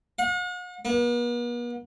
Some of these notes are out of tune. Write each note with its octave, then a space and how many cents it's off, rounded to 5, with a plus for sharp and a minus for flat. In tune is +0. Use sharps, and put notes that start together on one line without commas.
F#5 -45
B3 -45